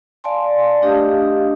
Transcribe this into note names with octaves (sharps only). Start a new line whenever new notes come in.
D5 F5 G#5 A5 C6
A3 D4 G4 D#5 F5 D#6